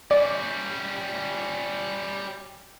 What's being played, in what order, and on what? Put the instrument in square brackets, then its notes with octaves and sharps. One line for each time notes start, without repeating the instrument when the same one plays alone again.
[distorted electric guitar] G3 C#4 [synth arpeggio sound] D5